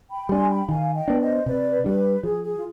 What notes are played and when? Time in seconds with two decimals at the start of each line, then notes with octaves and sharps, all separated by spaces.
0.10 G5 B5
0.29 G3 D4 G#5 C6
0.49 G5 B5
0.68 D#3 F5 G#5
0.95 D#5 G5
1.08 B3 D4
1.20 C5 D#5
1.45 C3 B4 D5
1.84 G3 D4 B4
2.23 F3 G#4
2.43 G#4
2.55 F4